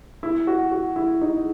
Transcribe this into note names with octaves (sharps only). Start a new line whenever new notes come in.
E4
F#4
F#4
E4
D#4